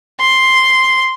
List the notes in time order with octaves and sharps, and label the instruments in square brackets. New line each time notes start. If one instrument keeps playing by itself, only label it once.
[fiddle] C6